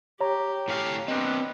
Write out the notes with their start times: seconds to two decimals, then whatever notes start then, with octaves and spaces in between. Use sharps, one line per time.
0.21 G4 C#5 A#5
0.68 A2 C#4 F5
1.08 B3 C4 D4 D#5